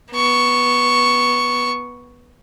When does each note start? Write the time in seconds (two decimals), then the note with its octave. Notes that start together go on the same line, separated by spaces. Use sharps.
0.12 B3 C#6